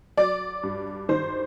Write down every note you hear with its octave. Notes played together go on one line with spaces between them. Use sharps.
F#3 D5
G2
D#3 C5